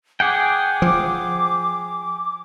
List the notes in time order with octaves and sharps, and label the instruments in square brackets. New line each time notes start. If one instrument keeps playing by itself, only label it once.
[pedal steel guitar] G#4 F#5 G5 [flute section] D6
[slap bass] F3